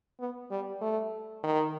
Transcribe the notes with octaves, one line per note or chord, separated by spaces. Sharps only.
B3
G3
A3
D#3